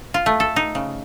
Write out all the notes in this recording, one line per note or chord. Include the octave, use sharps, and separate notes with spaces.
F4
A3
A4
D#4
C#3